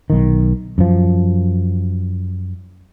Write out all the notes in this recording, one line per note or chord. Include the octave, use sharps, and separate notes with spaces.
B1 D#3
F#2 F3